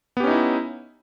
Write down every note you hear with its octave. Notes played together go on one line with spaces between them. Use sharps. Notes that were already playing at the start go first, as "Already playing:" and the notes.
B3 C#4 D#4 E4 G4